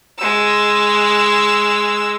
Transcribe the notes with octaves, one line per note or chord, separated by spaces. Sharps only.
G#3 E6